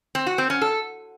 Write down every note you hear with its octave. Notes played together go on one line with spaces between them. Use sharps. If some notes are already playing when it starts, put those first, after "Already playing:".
C4
F#4
C4
C#4
A4